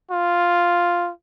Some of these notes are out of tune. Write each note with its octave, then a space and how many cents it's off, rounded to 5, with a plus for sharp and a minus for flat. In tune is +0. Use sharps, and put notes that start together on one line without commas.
F4 +0